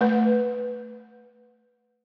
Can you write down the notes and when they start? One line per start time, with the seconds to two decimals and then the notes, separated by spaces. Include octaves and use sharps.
0.01 A3 B4